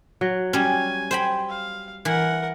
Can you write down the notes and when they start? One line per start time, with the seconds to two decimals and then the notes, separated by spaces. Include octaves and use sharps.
0.21 F#3
0.53 G3 C#4 G#5
1.11 C5 G5 B5
1.49 F5
2.05 E3 A#4 F#5